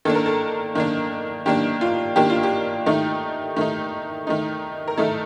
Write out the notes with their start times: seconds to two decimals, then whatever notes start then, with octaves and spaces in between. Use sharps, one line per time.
0.05 D#3 A#3 D4 A4
0.15 A#4
0.26 A4
0.75 D#3 A#3 D4
1.46 D#3 A#3 D4 G4
1.81 F4
2.16 D#3 A#3 D4 G4
2.30 F4
2.43 G4
2.86 D#3 A3 D#4
3.56 D#3 A3 D#4
4.27 D#3 A3 D#4
4.88 A#4
4.97 D#3 A3 D#4 A4